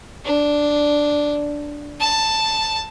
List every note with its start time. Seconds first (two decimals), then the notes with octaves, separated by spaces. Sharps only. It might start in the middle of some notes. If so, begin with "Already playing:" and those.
0.25 D4
2.00 A5